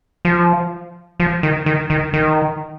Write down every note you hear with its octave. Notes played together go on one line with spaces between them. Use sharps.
F3
F3
D#3
D#3
D#3
D#3